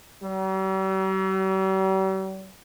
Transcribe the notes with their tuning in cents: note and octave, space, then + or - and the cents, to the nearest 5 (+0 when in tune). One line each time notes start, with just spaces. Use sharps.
G3 -45